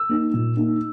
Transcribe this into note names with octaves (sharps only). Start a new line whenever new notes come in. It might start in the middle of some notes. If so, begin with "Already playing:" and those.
Already playing: E6
A#3 D#4
A#2
A#3 D#4